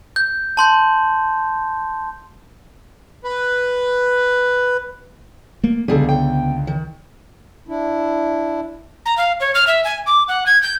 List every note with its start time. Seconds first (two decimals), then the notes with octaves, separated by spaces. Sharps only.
0.16 G6
0.57 A5 C6 G6
3.24 B4
5.64 A3 A#3
5.88 C#2 D3 G3 B3 G#4 A4
6.09 G5
6.67 D#3
7.68 D4 E4
9.05 A#5
9.17 F5
9.40 C#5
9.54 F6
9.67 E5
9.84 G#5
10.06 D6
10.28 F#5
10.46 G#6
10.62 G6